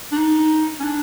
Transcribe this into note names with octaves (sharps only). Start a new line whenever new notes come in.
D4
D#4
C#4
D4